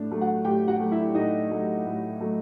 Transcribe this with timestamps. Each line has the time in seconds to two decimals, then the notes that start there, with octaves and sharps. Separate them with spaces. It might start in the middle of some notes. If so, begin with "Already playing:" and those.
Already playing: A2 D4
0.10 F#3 A3
0.21 F#4 F#5
0.45 A2 G4 G5
0.68 F#4 F#5
0.80 F#3 A3
0.91 E4 E5
1.15 A2 D#4 D#5
1.50 F#3 A3
1.86 A2
2.20 F#3 A3